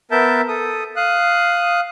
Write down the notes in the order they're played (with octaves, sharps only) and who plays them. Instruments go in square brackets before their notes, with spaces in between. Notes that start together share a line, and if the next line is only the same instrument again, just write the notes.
[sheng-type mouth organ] B3 A#4 E5 A5 G6
A4 D#6
F5 D#6 F#6